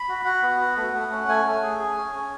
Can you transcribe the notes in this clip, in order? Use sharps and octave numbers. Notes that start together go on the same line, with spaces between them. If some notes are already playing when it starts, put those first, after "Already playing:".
Already playing: B5
F#4
F#4 F#5
B3
F#4
A3
A3
C#4
A3 G#5
A3
G#4
G#4
C#4
C#4